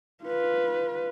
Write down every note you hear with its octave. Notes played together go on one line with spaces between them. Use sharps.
F4 B4